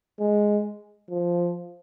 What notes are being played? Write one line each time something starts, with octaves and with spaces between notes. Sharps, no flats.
G#3
F3